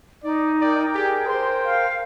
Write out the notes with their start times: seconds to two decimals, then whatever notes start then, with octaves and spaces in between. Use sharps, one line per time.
0.24 D#4 D5
0.61 A#4 D5 G5
0.95 G4 G#4
1.27 C5 C6
1.65 F5